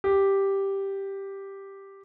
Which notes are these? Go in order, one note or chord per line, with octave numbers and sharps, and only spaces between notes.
G4